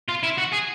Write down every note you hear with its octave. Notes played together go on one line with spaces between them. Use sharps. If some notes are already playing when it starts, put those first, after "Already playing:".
F4
E4
F#4
G#4